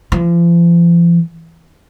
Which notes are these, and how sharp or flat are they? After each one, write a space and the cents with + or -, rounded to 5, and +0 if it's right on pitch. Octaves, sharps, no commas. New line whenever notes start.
F3 -40